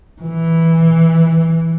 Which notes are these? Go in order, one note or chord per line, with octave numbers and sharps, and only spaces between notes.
E3